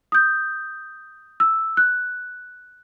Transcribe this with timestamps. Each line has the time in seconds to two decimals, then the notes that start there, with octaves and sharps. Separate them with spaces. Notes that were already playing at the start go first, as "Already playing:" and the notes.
0.12 D#6 G6
1.40 E6
1.77 F#6